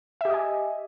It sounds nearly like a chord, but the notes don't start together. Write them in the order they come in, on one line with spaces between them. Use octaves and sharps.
E5 G4 D#5 G#5